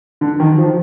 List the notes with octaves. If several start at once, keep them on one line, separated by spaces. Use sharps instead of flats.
D3
D#3
F3